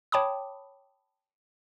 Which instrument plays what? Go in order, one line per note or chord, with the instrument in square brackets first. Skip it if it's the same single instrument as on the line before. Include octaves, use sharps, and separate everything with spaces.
[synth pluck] C#5 G5 A5 B5 D6 D#6